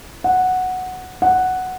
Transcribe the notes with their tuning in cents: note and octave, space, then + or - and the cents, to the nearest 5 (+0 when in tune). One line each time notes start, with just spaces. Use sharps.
F#5 -5
F#5 +0